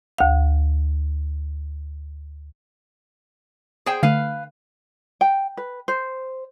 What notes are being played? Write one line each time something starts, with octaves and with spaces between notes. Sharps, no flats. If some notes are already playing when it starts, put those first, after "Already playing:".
D2 F5
G#4 C5 G5
D3 A3 B4 F5
G5
B4
C5